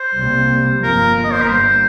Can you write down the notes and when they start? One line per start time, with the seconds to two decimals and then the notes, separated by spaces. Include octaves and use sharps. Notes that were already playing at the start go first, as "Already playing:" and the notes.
Already playing: C5
0.16 C2 C3 G3 A#3
0.83 G1 F2 F3 A#3 A#4
1.24 D#5
1.32 C5
1.42 A#4
1.48 G1 G2 G3 A#3 C5